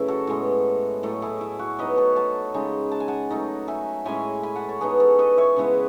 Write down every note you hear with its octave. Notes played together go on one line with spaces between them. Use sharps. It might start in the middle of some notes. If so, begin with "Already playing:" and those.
Already playing: C#3 F#3 A3 E4 B4 C#5
F#4 A4
A2 G#3 B3
A2 F#3 A3
E4 G#4
E4
F#4
F#3 B3 D#4 B4 D#5
A4 C#5
F#5 A5
C#3 G#3 D#4
A5
G#5
F#5 A5
F#3 A3 D#4
E5 G#5
A2 G#3 C#4 E4 G#5 B5
G#5 B5
F#5 A5
A4 C#5
E3 B3 D#4 G#4 B4
A4 C#5
B4 D#5
C#5 E5
C#3 G#3 B3 E4